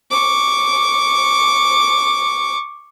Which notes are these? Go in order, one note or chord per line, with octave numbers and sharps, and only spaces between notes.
C#6 D6